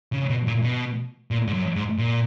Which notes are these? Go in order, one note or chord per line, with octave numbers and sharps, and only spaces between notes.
C#3
B2
A#2
B2
A#2
G#2
F#2
G#2
A#2